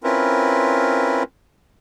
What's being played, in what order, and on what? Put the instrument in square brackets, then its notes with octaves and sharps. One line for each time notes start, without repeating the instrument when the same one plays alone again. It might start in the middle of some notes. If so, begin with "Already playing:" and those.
[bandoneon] C4 C#4 E4 F4 A#4 B4